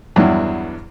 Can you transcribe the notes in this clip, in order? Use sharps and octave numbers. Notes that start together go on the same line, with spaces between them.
E2 G2 F#3 E4